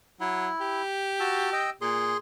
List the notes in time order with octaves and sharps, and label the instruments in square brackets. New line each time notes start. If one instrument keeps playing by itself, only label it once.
[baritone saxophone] F#3 [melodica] E4
[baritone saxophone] G4
[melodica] F#4 A5 E6
D#5 G5 E6
[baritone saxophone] A#2 [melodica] G#4 C6